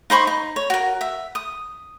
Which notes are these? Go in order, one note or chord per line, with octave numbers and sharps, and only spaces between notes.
D#4 C5 B5 C#6
D#4
C#5
F#4 A#4
E5
D#6